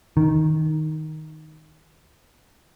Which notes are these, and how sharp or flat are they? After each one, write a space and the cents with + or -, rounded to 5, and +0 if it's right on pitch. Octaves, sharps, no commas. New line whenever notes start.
D#3 +0